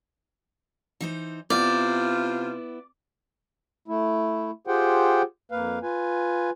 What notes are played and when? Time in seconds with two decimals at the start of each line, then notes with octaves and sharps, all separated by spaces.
1.01 E3 D#4 C5
1.50 C3 B3 E4 F4 D5
3.88 A3 E4
4.67 F4 G4 G#4 C5 F#5 G5
5.52 F2 A#3 B4 F5
5.83 F4 B4 G#5